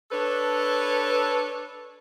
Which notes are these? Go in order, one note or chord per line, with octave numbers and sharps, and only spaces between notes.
D4 A4 B4 C#5